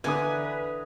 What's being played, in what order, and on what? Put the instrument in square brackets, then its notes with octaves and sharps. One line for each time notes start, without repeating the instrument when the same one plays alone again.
[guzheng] D3 E3 [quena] B4 [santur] G#5 A#5 D#6